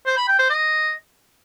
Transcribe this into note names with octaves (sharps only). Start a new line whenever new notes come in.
C5
B5
G5
C5
D#5